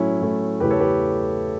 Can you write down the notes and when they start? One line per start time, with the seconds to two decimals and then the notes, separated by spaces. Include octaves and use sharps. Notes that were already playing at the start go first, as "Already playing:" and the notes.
Already playing: A2 F#3 A3 C#4 E4
0.21 A2 F#3 A3
0.60 E2 C#3 E3 A3 G4 B4
0.71 A4 C#5
0.80 G4 B4